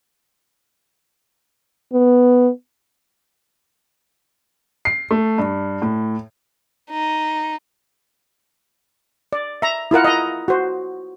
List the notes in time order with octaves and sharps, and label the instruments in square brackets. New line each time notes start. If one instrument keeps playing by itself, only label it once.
[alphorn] B3
[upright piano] C7
A3
G2
A2
[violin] D#4
[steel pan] D5
E5 A#5
E4 F4 A#4 F#5
D#5 A#5
F#4 C5